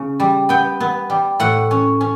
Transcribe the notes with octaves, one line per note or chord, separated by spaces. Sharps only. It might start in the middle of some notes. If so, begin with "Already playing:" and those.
Already playing: C#3
G3
B3 G5
B3
G3
A2 F#5
C#4
C#4